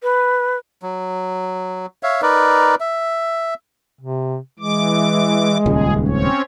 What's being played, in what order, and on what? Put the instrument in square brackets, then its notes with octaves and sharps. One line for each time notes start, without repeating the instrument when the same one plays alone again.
[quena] B4
[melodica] F#3
C#5 E5 F5
D#4 A#4 B4 D5
E5
[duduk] C3
[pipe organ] E3 D6 [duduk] G#3
[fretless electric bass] D#1 C#2 [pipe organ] G#4
[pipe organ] C4 C#4 C#5